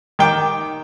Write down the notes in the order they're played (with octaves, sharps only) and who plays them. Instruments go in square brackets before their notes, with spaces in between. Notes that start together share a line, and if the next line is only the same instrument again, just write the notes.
[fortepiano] D#3 G5 D6